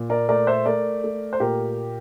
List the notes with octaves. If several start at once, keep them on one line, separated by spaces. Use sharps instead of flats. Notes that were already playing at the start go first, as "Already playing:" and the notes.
Already playing: A#2
A#4 D5
A3 A#4 D5
C5 E5
A3 A#4 D5
A3
C5
A#2 G4 A#4